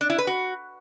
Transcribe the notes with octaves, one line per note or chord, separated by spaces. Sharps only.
D4
E4
B4
F#4